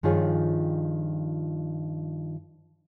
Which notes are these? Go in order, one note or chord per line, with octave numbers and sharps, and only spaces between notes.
G2 D#3 F3 F4 G#4 C#5